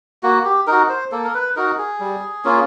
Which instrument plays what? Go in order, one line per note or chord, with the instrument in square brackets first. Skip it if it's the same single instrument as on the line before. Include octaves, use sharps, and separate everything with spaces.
[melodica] A#3 F#4
G4
D#4 F#4 A#4
C5
A#3 A4
A#4
B4
D#4 F#4 A#4
G#4
G3
A#3 C#4 F4